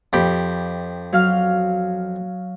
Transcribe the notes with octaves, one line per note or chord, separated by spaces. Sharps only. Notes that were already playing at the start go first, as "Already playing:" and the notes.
F2 G4 B5
F#3 F5 F6